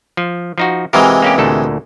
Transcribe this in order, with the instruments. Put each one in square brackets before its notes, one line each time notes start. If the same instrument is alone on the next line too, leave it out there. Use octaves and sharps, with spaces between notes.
[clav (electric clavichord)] F3
F3 D#4 F#4
[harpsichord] C3 E3 G#3 [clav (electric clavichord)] F#4 A#4 F5
[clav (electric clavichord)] A#3 C#4 G4
D2 A#2 A4